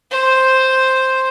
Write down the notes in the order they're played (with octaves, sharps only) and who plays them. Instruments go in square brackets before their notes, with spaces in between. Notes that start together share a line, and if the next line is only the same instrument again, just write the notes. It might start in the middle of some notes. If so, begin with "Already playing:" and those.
[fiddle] C5